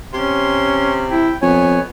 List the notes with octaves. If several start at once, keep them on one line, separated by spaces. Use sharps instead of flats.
C3 C#4 C6
E4 G5
F2 B3 C#5 G#5